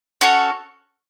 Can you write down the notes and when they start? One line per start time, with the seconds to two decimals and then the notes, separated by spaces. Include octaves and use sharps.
0.21 C#4 F#4 A4 C#5